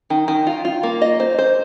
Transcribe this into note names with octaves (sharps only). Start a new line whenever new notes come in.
D#3
D#3
F4
F4
A#3
D#5
C5
C5